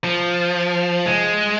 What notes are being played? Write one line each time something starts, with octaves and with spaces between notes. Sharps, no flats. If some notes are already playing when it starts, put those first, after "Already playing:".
F3
G#3